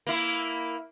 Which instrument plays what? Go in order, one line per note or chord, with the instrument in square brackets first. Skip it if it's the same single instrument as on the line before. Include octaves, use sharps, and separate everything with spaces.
[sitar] A#3 E4